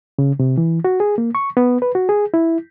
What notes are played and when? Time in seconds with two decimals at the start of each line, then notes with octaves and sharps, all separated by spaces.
0.19 C#3
0.40 C3
0.58 E3
0.85 F#4
1.00 G#4
1.18 A#3
1.35 C#6
1.57 B3
1.82 B4
1.95 F#4
2.09 G#4
2.34 E4